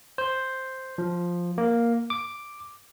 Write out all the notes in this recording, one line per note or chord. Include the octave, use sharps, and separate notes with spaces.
C5
F3
A#3
D6